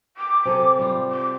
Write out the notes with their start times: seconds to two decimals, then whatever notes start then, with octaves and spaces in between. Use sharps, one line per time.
0.17 D6
0.45 C3 G#4 A4
0.79 G3 F4
1.10 D6